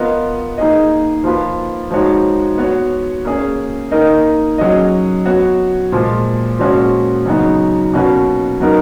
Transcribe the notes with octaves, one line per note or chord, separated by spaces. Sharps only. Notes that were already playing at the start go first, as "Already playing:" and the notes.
Already playing: B3 F4 A#4 D#5
A#3 D#4 G#4 D#5
F3 A#3 F4 B4
F3 G#3 D#4 F#4 C#5
B3 F#4 C#5
A#3 C#4 G#4
A#3 D#4 A#4 D#5
F#3 C#4 G#4 D#5
B3 F#4 C#5
A#2 F3 G#3
A#2 F3 G#3 C#4 F#4
C#3 F#3 B3 D#4 F#4
B2 A#3 C#4 F#4 B4
F#3 B3 D#4 A#4